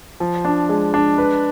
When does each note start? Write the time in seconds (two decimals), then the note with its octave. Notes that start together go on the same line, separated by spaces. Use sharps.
0.20 F3
0.45 D4
0.69 G#3
0.94 D4
1.18 B4